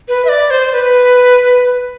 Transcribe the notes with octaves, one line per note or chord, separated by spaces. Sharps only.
B4
E5
D5
C5
B4